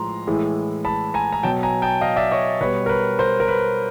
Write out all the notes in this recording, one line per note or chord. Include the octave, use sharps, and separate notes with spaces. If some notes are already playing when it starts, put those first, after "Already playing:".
Already playing: A2 F3 G#3 A#5 C6
A2 E3 G#3
A5 B5
G#5 A#5
A#5
B2 F#3 G5 A5
G#5 A#5
G5 A5
D#5 F5
D5 E5
C#5 D#5
B2 G3 B4 C#5
A#4
B4
A#4 C5
A#4
B4